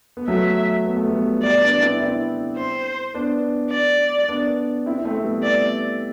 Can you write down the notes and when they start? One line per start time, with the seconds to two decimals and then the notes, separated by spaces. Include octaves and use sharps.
0.17 B3
0.28 F#3 A3 E5
0.86 B3
0.97 A3
1.07 G3 B3
1.43 G3 B3 D5
1.61 B3 D4
1.80 C4 E4
2.00 C4 E4
2.57 C5
3.14 B3 D4
3.71 D5
4.28 B3 D4
4.86 C4 E4
5.05 A3 C4
5.24 G3 B3
5.43 D5